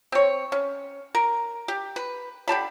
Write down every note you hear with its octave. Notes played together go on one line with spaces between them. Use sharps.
C4 C#5
C#4
A#4
G4
B4
D3 G4 A5 B5